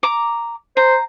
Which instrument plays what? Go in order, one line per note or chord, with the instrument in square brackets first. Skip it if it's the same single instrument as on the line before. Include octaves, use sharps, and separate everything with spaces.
[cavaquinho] A#5 D6
[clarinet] C5 [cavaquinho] A#5